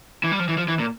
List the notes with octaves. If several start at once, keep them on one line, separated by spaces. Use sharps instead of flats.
E3
G3
F3
E3
F3
E3
A#2